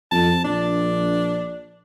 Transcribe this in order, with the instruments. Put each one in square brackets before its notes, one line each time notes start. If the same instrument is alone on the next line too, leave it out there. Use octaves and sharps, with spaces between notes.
[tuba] F2 [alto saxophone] A5
[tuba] A#1 [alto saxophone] D4